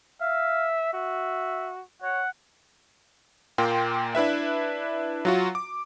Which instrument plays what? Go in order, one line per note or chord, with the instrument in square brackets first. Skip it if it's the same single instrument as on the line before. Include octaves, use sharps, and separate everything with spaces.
[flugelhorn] E5 [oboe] F5
[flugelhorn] F#4 [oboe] E5
[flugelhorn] C#5 [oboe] F#5
[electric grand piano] A#2 A#3 G5 C6
D4 E4 B4 E5
F#3 F4 F#4
D6